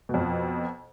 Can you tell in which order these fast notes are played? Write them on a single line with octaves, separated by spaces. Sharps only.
B2 F2 F3